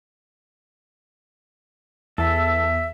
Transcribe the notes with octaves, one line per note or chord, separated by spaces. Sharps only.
E2 A4 E5